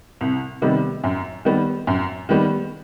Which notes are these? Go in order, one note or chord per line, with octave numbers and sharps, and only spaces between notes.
C2
C3 D#3 G3 B3
F#2
D#3 G3 B3
F#2
D#3 G3 B3